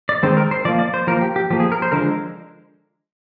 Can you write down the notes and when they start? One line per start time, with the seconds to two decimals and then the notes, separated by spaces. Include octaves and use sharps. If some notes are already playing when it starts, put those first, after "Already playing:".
0.09 D5
0.23 D#3 G#3 C4 C5
0.37 A#4
0.51 C5
0.65 F3 D5
0.69 A#3
0.79 D5
0.94 C5
1.07 F3 A#3 A#4
1.21 G4
1.36 G4
1.50 F3 A#3 G4
1.60 G#4
1.72 A#4
1.82 C5
1.92 D3 F3 G#3 A#4